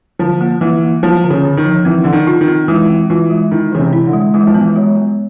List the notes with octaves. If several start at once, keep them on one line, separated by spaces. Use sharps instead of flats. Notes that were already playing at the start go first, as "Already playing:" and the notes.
D3 F3
A#3
E3 A#3
A#3
F3 A#3
D3
C#3
D3
D#3
F3
E3 C4
D3 A4
D#3
F4
D#3
C4
E3 G#3
C4
E3 F4
G#3
D#3 E4
C#3 E3
C3
E4
D3
G#3
E3 G#3
F3
B3
E3
F#3 G#3
B3